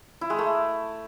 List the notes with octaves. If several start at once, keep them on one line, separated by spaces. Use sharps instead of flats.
E4
G#3
A3